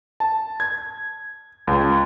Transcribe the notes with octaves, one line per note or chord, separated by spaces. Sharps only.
A5
G#6
C#2